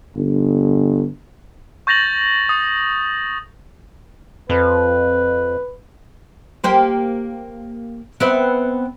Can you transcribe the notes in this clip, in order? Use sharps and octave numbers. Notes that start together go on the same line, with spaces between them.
G1
C#6 G6 A6 A#6 F7 F#7
D#6
F2 B4
A#3 G4 C5
B3 C4 E5